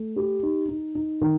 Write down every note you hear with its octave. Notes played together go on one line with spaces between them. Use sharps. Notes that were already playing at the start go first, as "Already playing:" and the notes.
Already playing: A3
G4
D#4
D#4
D#4
D#3